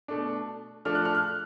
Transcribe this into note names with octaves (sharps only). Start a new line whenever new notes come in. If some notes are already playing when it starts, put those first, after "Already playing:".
B2 A3 D4
F3 A3 D4 F6
F#6
F6
F#6